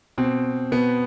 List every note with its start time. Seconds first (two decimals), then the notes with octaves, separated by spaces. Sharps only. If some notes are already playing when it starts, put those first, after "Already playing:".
0.18 B2 C4
0.72 B2 B3